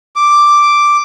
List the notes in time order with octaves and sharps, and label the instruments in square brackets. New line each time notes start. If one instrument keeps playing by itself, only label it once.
[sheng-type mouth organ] D6